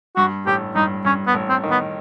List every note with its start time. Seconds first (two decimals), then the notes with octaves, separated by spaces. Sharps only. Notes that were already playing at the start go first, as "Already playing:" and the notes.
0.16 G2 F#4
0.46 A1 G4
0.75 G2 D#4
1.05 G2 C#4
1.27 B3
1.34 A1
1.49 C4
1.63 D#3
1.71 B3